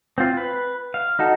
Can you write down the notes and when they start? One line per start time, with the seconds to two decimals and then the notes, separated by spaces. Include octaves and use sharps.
0.18 C4 F4
0.37 B4
0.94 F5
1.19 D#4 F#4 A4